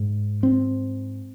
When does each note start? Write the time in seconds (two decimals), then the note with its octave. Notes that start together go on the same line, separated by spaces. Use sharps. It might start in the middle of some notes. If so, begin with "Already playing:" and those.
Already playing: G#2
0.43 C4